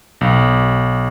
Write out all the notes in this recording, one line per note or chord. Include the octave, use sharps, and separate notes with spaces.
B1